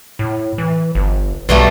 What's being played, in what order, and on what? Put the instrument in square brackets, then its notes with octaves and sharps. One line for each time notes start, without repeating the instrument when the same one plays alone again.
[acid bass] A2
E3
G1
[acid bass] B1 [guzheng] B2 G3 A3